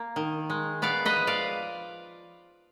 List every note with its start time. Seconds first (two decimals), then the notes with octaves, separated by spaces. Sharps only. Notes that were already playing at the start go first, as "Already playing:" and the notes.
Already playing: A#3
0.16 D#3
0.50 G#3
0.82 B3 D5 F5
1.05 B4 D#5
1.17 F3
1.27 D5 F5